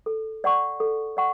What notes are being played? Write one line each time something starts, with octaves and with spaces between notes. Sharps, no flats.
A4
D5 F#5 C#6
A4
D5 F#5 C#6